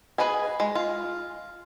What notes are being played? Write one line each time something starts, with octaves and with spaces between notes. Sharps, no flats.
G#4 A4 B4 D#5 G#5
G#3
F4